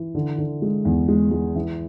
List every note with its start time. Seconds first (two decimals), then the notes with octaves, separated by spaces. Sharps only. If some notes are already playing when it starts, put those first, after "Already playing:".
Already playing: E3
0.15 D3
0.38 D3
0.62 G#3
0.85 E2
1.08 G#3
1.31 G#3
1.55 E3